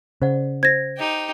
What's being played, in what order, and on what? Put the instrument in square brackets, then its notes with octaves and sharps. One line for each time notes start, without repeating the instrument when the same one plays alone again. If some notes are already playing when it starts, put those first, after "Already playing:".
[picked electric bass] C#3 [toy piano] C5 D5 F#5
[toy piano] C5 [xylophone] G#6 A#6
[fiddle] D#4 G4